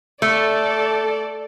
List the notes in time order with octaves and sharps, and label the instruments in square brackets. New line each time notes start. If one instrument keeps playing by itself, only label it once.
[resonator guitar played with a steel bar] A3 [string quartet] A4 D5